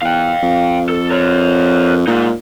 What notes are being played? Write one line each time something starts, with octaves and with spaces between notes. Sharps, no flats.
E2 F5 G5
F2
A4
A#4 C#5
A#2 G#3 D#4